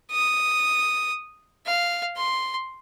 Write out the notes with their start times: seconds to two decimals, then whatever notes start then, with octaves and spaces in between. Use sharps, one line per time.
0.11 D#6
1.66 F5
2.16 C6